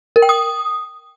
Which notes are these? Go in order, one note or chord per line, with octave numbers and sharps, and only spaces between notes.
A#4
G5
D#6